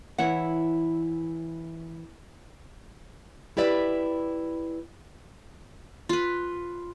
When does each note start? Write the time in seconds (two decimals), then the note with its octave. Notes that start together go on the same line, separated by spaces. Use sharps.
0.18 E3 E4 C#5 F#5
3.57 E4 G4 B4 D5 E5
6.09 F4 B4